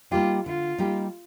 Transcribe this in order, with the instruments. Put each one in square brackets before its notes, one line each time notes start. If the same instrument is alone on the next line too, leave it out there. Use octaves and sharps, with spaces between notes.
[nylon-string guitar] G3 A#3 D#4 G4 [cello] F4
[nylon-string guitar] D3 [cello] F4
[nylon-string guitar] G3 A#3 D#4 G4